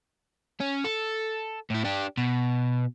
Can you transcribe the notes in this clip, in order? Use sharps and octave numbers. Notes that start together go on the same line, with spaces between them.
C#4
A4
A2 E4
D4 G4
B2